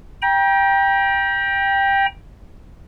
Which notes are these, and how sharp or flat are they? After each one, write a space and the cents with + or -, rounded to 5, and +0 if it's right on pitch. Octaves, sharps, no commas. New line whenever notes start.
G5 +10 A#5 +40